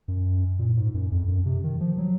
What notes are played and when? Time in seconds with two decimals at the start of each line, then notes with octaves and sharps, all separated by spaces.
0.08 F#2
0.59 A#2
0.77 G#2
0.94 F#2
1.11 F2
1.28 F#2
1.45 C3
1.64 D#3
1.81 F3
1.98 F#3